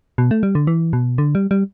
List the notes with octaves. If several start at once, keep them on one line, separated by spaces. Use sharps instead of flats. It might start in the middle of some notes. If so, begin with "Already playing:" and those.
B2
A3
G3
D3
E3
B2
D3
G3
G3